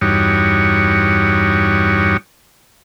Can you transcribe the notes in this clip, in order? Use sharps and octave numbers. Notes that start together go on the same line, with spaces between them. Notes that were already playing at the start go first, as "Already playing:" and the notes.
E2 G2 G3 D#4 F#4 C#5